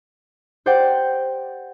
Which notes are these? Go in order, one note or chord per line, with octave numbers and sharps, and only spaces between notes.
G4 C5 D5 F#5 G5